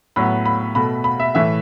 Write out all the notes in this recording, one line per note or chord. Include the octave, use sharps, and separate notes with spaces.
A2 F#3 B3 B5
B5
B2 A3 B5
B5
E5
A2 E3 A3 E5